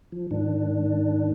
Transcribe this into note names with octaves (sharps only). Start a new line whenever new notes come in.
F3
G#2 D#3 D4